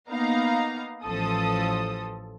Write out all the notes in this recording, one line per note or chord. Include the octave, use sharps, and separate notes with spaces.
A#3 B3 D#4 F5 A#5
A1 F3 A4 D#6